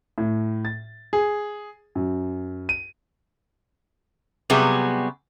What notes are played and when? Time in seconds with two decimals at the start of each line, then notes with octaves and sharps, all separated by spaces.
0.18 A2
0.65 A6
1.13 G#4
1.95 F#2
2.69 D#7
4.50 C3 F#3 G3 B3 G#4